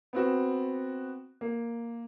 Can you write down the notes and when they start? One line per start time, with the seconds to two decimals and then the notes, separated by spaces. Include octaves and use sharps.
0.13 B3 C4 F#4
1.41 A#3